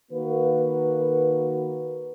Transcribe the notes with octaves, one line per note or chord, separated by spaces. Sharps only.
D#3 A#3 F#4 A#4 B4